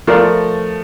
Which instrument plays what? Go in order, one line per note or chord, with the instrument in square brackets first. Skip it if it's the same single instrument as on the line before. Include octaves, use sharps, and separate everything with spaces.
[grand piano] F3 A3 [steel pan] F4 A#4 D5